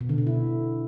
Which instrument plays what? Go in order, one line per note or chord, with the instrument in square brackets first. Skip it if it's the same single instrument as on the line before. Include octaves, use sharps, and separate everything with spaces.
[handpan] B2
D3
B2
E4